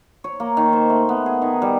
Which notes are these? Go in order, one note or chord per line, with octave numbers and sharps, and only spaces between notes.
C#5
A#3
D#3
C5
A3
B3
G#4
D#3
G3